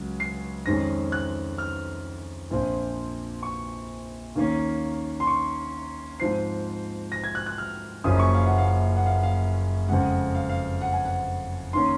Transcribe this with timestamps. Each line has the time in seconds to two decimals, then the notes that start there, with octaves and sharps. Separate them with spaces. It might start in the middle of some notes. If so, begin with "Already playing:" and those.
Already playing: C#2 C#3 F#3
0.20 C7
0.66 F2 D#3 G#3 C#4 A#6
1.12 F#6
1.58 F6
2.50 A#1 A#2 F3 C4
3.43 C#6
4.36 D#2 D#3 A#3 C#4
5.20 C6
5.27 C#6
6.20 G#2 F3 C4 C7
7.12 A#6
7.24 G#6
7.35 F#6
7.46 F#6
7.58 F6
8.04 F#1 F#2 F3 A#3 C#4 D#6
8.19 C#6
8.35 F5
8.46 F#5
8.58 F5
8.97 F#5
9.06 F5
9.23 F5
9.89 F2 C#3 G#3 F#5
10.35 F5
10.49 F5
10.81 F#5
10.93 G#5
11.05 F#5
11.73 D#3 A#3 C#4 C6